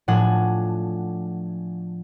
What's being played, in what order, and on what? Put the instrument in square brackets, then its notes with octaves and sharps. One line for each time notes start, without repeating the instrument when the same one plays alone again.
[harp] A2 F3 D4 F#5 G#5